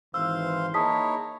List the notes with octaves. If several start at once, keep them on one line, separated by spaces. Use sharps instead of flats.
G#1 E3 C5 F5 C6 E6
A#3 D#4 E4 G#4 C#5 A5 D#6 B6